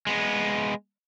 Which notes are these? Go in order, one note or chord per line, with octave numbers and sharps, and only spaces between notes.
G#3 B3